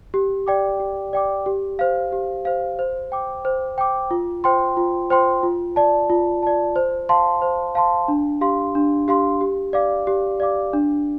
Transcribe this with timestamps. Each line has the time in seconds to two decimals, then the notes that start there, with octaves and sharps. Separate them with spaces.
0.14 G4
0.47 D5 G5 D6
0.80 G4
1.13 D5 G5 D6
1.46 G4
1.79 C5 F5
2.12 G4
2.45 C5 F5
2.79 C5
3.12 G5 D6
3.45 C5
3.78 G5 D6
4.11 F4
4.44 C5 G5 C6
4.77 F4
5.10 C5 G5 C6
5.43 F4
5.76 D5 A5
6.10 F4
6.43 D5 A5
6.76 C5
7.09 F5 A5 C6
7.42 C5
7.75 F5 A5 C6
8.08 D4
8.41 G4 F5 C6
8.75 D4
9.08 G4 F5 C6
9.41 G4
9.73 D5 F5 D6
10.07 G4
10.40 D5 F5 D6
10.73 D4